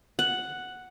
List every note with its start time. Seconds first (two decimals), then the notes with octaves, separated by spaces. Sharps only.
0.19 F#5